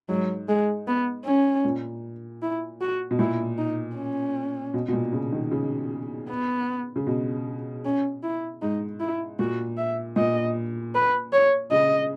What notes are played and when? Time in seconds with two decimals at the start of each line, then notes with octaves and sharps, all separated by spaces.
0.09 G#2 F#3
0.48 G#3
0.87 B3
1.25 C#4
1.65 A#2
2.42 E4
2.81 F#4
3.11 B2
3.19 A#2 E4
3.57 D#4
3.96 C#4
4.74 B2
4.88 B2
4.93 A#2
5.12 C#3
5.32 D#3
5.51 C#3
6.29 B3
6.96 C#3
7.07 B2
7.85 C#4
8.23 E4
8.62 G#2 D#4
9.00 E4
9.39 A#2 F#4
9.77 E5
10.16 A#2 D#5
10.95 B4
11.33 C#5
11.71 C#3 D#5